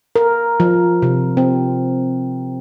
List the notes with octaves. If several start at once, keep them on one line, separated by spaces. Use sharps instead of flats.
A#4
F3
C3
C4